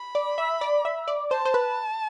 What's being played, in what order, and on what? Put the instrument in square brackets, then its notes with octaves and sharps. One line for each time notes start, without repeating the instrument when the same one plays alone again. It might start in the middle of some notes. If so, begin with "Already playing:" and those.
Already playing: [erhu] B5
[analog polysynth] D5
E5
D5
E5
D5
[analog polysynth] C5 [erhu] A5
[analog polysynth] C5
B4